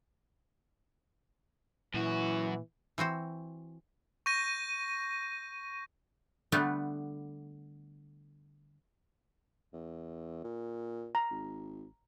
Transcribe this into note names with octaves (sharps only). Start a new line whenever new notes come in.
F#2 A#2 E3 E4 F#4
E3 C4 F#4 C5
C#6 G6 A#6 D#7
D3 G3 A3 B3
E2
A#2
A#5
G#1